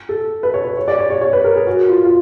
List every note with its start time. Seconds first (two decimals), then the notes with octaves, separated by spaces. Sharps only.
0.09 A4
0.43 B4
0.54 C#5
0.65 C#5
0.77 C#5
0.88 D5
0.99 C#5
1.10 C#5
1.21 C#5
1.33 B4
1.44 A#4
1.56 G#4
1.67 F#4
1.89 F4
2.04 F4